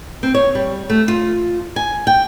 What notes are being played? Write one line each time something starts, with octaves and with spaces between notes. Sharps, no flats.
C4
C#5
G3
A3
F4
G#5
G5